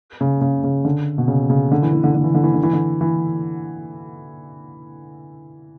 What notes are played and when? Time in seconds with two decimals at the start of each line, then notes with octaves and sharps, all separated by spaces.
0.21 C#3
0.41 C#3
0.64 C#3
0.85 D3
1.18 B2
1.28 C#3
1.50 C#3
1.72 D3
1.82 E3
1.93 E3
2.04 D3
2.15 D3
2.24 E3
2.35 D3
2.44 E3
2.54 D3
2.63 E3
2.73 D3
3.01 E3